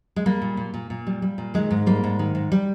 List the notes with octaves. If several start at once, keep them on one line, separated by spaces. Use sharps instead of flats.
G#3
G3 A#3
A#2
A#2
A#2
A#2
G3
G3
A#2
D#3 G#3
G#2
G3 A#3
G#2
D#3
G#2
G3